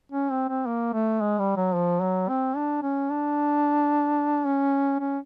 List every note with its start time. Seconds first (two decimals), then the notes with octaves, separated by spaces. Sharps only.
0.12 C#4
0.31 C4
0.49 C4
0.67 A#3
0.93 A3
1.21 G#3
1.39 G3
1.57 F#3
1.75 F3
2.02 F#3
2.29 C4
2.56 D4
2.83 C#4
3.11 D4
4.46 C#4
5.00 C#4